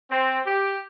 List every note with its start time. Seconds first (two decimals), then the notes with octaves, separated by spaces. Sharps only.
0.10 C4
0.46 G4